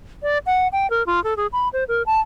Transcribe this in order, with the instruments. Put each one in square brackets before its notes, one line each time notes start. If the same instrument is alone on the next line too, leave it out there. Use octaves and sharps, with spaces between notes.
[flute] D5
F#5
G5
A#4
F4
A4
G#4
B5
C5
A#4
A5